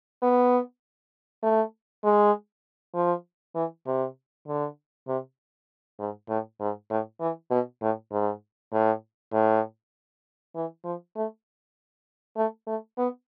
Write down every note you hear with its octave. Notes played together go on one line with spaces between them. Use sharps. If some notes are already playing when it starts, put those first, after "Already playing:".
B3
A3
G#3
F3
E3
C3
D3
C3
G#2
A2
G#2
A2
E3
B2
A2
G#2
A2
A2
E3
F3
A3
A3
A3
B3